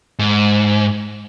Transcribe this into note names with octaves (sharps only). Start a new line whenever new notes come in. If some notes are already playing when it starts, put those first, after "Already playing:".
G#2